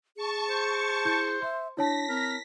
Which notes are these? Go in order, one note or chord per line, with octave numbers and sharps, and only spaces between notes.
G#4 A5 C#6 C#7
C5
E4 G6
E5 C6
D4 E4 C#5 A5 A#6 B6
C4 A#4